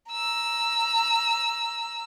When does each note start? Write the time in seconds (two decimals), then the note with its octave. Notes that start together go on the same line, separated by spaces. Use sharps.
0.11 A#5 E6